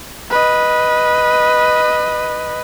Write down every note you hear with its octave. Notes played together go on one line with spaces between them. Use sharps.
B4 D#5